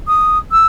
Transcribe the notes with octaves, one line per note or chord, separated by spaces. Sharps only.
D#6
E6